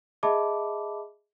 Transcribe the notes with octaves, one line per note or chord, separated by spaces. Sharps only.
G#4 D#5 E5 A5 B5 D6